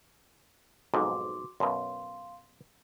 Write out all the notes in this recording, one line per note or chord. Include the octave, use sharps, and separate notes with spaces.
B1 F2 G#2 F#4 C6 D6
F#2 B2 F5 C6